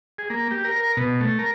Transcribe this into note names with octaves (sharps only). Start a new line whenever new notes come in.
G#4
A#3
G4
A#4
A#4
B2
A3
A#4